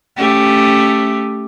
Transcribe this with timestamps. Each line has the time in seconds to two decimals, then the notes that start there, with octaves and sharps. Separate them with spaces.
0.16 A3 C#4 G4